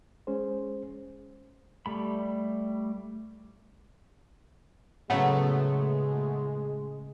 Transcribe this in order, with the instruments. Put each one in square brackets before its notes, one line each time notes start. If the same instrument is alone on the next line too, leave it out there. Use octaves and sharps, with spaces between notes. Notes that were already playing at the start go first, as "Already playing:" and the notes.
[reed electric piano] G#3 C#4 G#4 C5
[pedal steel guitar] G3 A3 B5
[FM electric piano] A2 C#3 [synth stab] F#3 A3 B3 [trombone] G#3